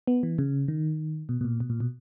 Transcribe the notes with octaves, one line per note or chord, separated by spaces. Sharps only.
B3
E3
C#3
D#3
B2
B2
A#2
B2
A#2
B2